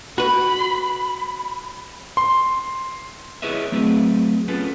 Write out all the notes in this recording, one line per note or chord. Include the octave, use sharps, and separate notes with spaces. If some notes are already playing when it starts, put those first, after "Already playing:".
F#4 B4 B5
C6
E4 G#4 B4 C#5 D#5 E5
F#3 A3 C4 G#4 B4
B3 C#4 F4 A4 B4